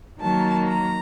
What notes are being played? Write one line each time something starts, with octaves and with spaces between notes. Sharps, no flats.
D#3 F#3 A#3 A5
A#5